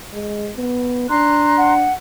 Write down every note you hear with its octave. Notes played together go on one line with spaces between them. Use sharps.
G#3
B3
D4 A#5 C6 F#6
F#5